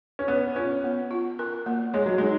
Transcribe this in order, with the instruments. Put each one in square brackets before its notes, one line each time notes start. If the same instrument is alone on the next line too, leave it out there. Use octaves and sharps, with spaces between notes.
[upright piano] C#4
[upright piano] B3 [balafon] C#5
[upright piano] C#4 [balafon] F4
[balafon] B3
F4
A#4
A#3
[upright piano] G#3 [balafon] C#5
[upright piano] F#3
[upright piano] G#3 [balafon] D#4